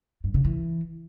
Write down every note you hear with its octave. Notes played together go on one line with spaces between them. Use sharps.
G2
C#3
E3